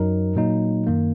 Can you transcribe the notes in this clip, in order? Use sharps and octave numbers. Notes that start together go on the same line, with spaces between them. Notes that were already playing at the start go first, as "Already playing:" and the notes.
Already playing: F#2 F#3 D#4 A#4
A#2 F#3 A#3 D#4
F#2 D#3 A#3